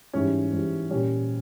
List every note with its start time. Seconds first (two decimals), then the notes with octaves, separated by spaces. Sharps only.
0.13 G#2 E3 G3 C#4
0.52 G#2 E3 G3
0.90 A#2 G3 C#4